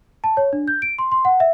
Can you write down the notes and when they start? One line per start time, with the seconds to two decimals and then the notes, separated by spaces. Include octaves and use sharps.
0.24 A5
0.37 C#5
0.53 D4
0.68 G6
0.82 D7
0.99 C6
1.12 C6
1.25 F#5
1.40 E5